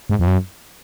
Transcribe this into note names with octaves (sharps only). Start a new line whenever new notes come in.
G#2
F2
F#2